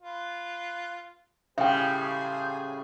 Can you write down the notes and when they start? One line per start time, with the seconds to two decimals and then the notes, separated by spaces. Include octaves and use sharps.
0.02 F4 B4
1.58 A2 C#3 G3 G#4 C5 E5 G5